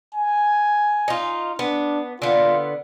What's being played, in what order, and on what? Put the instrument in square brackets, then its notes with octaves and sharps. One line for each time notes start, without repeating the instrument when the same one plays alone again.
[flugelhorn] G#5
[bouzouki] D#4 F4
[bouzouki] B3 [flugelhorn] D4
[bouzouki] D3 B3 [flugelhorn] F4